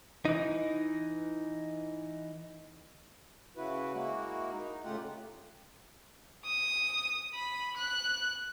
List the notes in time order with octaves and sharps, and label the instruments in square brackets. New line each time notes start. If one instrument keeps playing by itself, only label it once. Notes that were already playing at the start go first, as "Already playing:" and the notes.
[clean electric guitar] E3 D#4
[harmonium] C#3 E4 F#4 B4
G#3 A#3 E4 F#4
D#4
A2 C#3 A3 F4 G4 F#5
[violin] D#6
B5
F#6